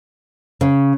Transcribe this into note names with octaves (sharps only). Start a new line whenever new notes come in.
C#3